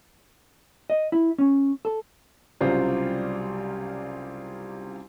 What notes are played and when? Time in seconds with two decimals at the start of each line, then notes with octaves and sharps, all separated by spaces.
0.90 D#5
1.12 E4
1.38 C#4
1.85 A4
2.61 C2 C#3 F#3 G3 F4 C5